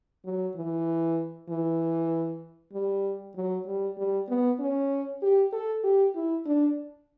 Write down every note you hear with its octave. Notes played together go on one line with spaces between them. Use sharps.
F#3
E3
E3
G3
F#3
G3
G3
B3
C#4
G4
A4
G4
E4
D4